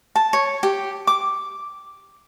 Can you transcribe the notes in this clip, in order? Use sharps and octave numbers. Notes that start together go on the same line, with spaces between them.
A5
C#5
G4
D6